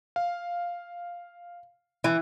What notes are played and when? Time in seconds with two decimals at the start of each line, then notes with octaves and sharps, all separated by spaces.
0.16 F5
2.04 E3 E4